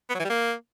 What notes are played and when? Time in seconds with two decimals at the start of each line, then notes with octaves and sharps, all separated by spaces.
0.09 B3
0.14 F#3
0.19 E3
0.24 G3
0.29 A#3